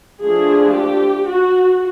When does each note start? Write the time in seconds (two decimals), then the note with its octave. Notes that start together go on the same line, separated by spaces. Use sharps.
0.24 F3 A3 D4 G#4
0.77 G4
1.31 F#4